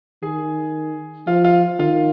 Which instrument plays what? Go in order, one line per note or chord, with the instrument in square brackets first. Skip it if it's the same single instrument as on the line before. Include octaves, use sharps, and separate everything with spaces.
[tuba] D#3 [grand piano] G#4 G#5
[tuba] F3 [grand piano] F4 F5
[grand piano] F4 F5
[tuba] D#3 [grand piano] F4 F5